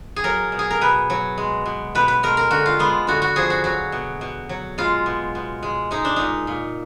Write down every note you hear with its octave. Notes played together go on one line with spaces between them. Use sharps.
G#4
F#3 A#4
B2
G#4
A#4
B2 B4
F#3
G#3
B2
B2 B4
B4
G#3 A#4
A#4
D3 F#4
F4
G#3 B3
D3 F#4
F#4
F3 G#4
F#4
F#3 F#4
B2
B2
F#3
G#3 F4
B2
B2
G#3
G#3 D#4
D4
A#2 D#4
A#2